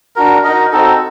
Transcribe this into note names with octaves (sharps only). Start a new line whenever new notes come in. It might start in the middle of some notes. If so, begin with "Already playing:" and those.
D4 F#4 A#4
D#4 F#4 A#4 D#5
C4 D#4 F#4 A4